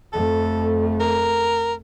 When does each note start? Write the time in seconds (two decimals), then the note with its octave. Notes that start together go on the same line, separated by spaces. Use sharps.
0.13 F2 A3 A4
1.00 A#4